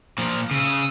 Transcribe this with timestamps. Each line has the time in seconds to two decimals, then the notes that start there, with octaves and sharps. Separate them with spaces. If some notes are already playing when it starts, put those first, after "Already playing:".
0.18 A#2 F3
0.51 C#3 D#6 E6